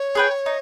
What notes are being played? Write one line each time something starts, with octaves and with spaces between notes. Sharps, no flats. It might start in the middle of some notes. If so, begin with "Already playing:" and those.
Already playing: C#5
G#4 B4 G5
D#4